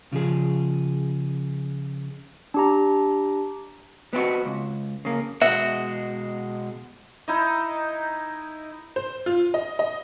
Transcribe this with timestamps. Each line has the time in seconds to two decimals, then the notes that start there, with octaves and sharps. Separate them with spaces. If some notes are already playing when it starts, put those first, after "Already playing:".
0.12 C#3 F3 G#4
2.54 D4 G4 A#5
4.13 B3 C4 F4 F#4
4.45 C#2
5.05 C#3 A#3
5.42 B2 G#3 F#4 E5
7.28 D#4 E4 D#5
8.96 C5
9.26 F4
9.54 D#5
9.79 D#5